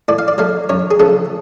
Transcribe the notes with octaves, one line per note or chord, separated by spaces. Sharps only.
A2 D5
F5
D5
F#3 A3 F5
F#2 C#5
G#4
C#3 F3 A3 A4